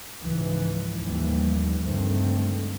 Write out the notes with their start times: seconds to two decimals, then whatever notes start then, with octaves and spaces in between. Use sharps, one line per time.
0.22 C#2 G#2 E3 F3
1.01 A1 D#2 A2 E3 F3 G3
1.81 C#2 G2 D3 D#3 A3 C4